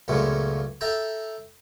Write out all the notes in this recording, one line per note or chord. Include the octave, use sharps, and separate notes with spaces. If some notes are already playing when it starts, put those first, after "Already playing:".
C#2 F#2 A#2 G#3 A3 B3
A4 E5 G5 A5 A#5